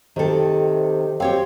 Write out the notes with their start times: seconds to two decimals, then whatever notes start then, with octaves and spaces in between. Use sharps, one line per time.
0.16 C3 D#3 A4
1.20 C4 G4 C#5 F5